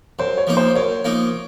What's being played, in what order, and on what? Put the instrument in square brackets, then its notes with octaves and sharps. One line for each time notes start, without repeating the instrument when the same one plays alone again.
[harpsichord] F#2 [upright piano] C5
[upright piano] C#5
[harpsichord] F3 A#3 D#4
[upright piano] C5
[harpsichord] F#2 [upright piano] C#5
[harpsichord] F3 A#3 D#4